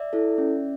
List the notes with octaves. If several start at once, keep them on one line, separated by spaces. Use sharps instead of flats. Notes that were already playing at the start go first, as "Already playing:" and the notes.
Already playing: D5 E5
E4 A4
C#4